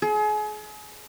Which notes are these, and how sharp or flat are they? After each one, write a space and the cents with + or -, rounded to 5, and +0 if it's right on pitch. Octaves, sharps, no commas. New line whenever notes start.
G#4 +35